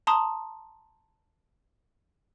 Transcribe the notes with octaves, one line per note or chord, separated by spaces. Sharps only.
A5 A#5 C6 D#6